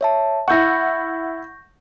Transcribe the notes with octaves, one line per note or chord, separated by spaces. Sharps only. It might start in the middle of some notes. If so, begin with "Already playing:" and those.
C#5 E5 A5
E4 F#5 C#6 G6 A#6